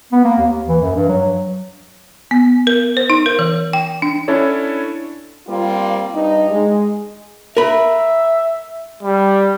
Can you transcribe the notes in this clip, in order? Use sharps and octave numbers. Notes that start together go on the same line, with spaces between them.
B3
A#3
D#2
E3
F#2
G2
F#3
B3
A#4
C5
D#4
A#4
E3
G5
D4
C#4 D4 E4 A4 C#5
G3 A#3 C4 F4
G2 D#4
G#3
A#4 E5 B5
G3